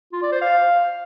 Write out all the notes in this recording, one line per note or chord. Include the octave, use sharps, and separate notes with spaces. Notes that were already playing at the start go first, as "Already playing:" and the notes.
F4
D5
C5
F5